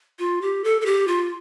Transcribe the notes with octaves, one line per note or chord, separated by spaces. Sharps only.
F4
G4
A4
A4
G4
F4